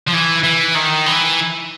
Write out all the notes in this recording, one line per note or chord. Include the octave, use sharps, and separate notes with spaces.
F3
E3
E3
D#3
E3